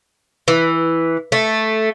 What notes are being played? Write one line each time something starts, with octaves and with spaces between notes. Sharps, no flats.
E3
A3